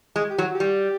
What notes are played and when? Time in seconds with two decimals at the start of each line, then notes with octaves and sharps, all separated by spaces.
0.16 G#3
0.30 G4
0.38 F#3
0.42 F#4
0.55 G4
0.60 G3